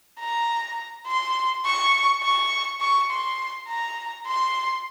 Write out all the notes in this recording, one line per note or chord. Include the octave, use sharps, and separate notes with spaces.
A#5
C6
C#6
C#6
C#6
C6
A#5
C6